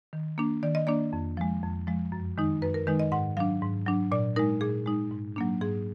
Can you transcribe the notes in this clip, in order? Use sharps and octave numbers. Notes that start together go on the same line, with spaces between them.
D#3
A#3 D4
D#3 D5
D#5
A#3 D4 D5
F2
F3 G#3
F2
F3 G#3
F#2
D#3 G#3 D#4
F#2 B4
A#4
D#3 G#3 D#4 B4
D#5
G#2 F#5
F#3 D4 F5
G#2
F#3 D4
A#2 D5
G#3 D#4 A#4
A#2 G#4
G#3 D#4
G#2
F#3 A#3 D4
G#2 G#4